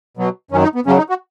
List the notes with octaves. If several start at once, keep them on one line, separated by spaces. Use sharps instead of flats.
B2 F#3
F#2 D#3 F#3 C#4
D#4
B3
F#2 C#3 F#3 C#4
D#4
F#4